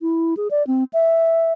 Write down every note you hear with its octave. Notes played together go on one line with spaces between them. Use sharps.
E4
G#4
D5
C4
E5